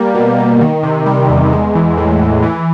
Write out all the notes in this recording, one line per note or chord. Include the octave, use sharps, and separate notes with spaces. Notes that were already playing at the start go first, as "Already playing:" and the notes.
Already playing: G3 A#3
B2
B2
D#3
C3
G3
E2
G#3
E3
A2
A2
E3